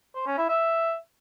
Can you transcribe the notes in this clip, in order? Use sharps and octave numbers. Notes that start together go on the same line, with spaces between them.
C5
C#4
E4
E5